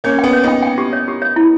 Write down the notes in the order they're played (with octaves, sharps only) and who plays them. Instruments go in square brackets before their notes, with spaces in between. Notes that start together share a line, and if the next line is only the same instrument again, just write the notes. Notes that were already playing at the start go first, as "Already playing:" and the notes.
[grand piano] A#3 C#4 [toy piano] C#5
[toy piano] G5
[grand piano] B3
[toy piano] C#5
[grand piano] B3 D#4 [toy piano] G5
[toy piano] G5
G4
C#5
G4
C#5
E4